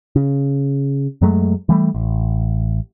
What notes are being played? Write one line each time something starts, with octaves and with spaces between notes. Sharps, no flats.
C#3
F#2 F#3 G#3 A3
E3 G3 A3
A1